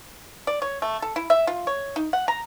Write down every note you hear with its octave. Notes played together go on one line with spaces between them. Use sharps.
D5
C#5
A3
A4
E4
E5
F4
C#5
D#4
F#5
A#5